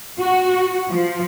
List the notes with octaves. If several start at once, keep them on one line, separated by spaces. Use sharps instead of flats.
F#4
F3